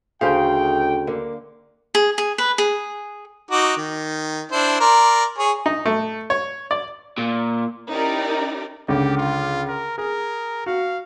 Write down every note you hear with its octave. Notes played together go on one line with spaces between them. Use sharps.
D2 C#3 G#4 C5 F5 G5
D3 A#3
G#4
G#4
B4
G#4
D#4 F#4 D6
D#3
D4 E4 C5
A#4 D5 C6
G#4 C#5
D#4
A3
C#5
D5
A#2
C#4 D#4 E4 G4 A#4 D5
C#2 D3 G4
F4
A#4
G#4 A#4
F#4 F5